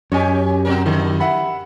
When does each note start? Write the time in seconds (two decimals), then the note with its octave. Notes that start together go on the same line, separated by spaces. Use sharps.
0.12 F#2 C#4 G4 C#5 D#5 G#5
0.65 B2 F#4 A#4
0.86 D3 D#3 E4
1.20 E5 F#5 B5